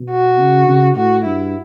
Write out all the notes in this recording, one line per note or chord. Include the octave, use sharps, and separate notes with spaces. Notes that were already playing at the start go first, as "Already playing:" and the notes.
Already playing: B2
F#4
C#3
C#3
A2 F#4
G2 E4